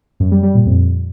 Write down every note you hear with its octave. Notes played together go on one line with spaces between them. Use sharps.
F#2
G3
G3
A#2
F2